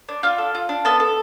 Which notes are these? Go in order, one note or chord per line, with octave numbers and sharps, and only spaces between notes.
D4
D4 F4 F5
A4
F4
D4
B3 A4 A5
A4